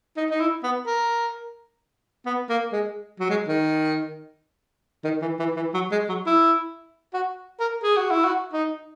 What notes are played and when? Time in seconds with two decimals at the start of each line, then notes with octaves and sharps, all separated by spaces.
0.17 D#4
0.30 D#4
0.40 E4
0.63 B3
0.86 A#4
2.26 B3
2.50 A#3
2.73 G#3
3.20 F#3
3.30 G#3
3.48 D#3
5.04 D#3
5.22 E3
5.39 E3
5.56 E3
5.74 F#3
5.92 G#3
6.09 F#3
6.26 E4
7.14 F#4
7.60 A#4
7.83 G#4
7.97 F#4
8.11 E4
8.24 F#4
8.53 D#4